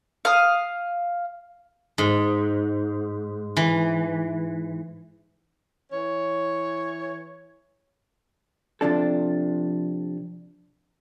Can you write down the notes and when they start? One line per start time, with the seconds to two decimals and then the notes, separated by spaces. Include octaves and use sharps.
0.25 F5 D#6
1.98 G#2
3.57 E3
5.91 E3 C#5
8.81 C3 F3 D4 A4